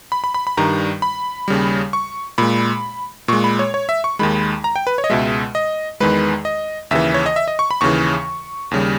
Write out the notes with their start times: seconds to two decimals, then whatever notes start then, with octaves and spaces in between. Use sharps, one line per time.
0.12 B5
0.24 B5
0.34 B5
0.47 B5
0.57 G2 D#3 G3 A#5
1.02 B5
1.48 D#2 C#3 G3
1.93 C#6
2.38 A#2 G#3 B5
3.28 A#2 G#3 C#6
3.44 B5
3.59 C#5
3.74 C#5
3.89 E5
4.04 C#6
4.19 D#2 D#3 G#3 B5
4.64 A#5
4.76 G5
4.87 B4
4.98 C#5
5.04 D#5
5.10 C#2 B2 G#3 E5
5.55 D#5
6.00 E2 D#3 G#3 B4
6.45 D#5
6.91 D#2 C#3 E3 E5
7.14 C#5
7.26 D#5
7.36 E5
7.48 D#5
7.59 C#6
7.71 B5
7.81 D#2 C#3 E3 C#6
8.71 D#2 C#3 G3